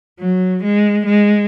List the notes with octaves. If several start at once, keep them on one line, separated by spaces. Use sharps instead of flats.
F#3
G#3
G#3